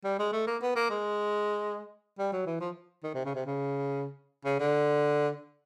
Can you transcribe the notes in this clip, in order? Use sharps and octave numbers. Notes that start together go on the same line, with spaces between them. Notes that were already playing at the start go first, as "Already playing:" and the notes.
G3
G#3
A3
A#3
B3
A#3
G#3
G3
F#3
E3
F3
D#3
C3
C#3
C3
C#3
C#3
D3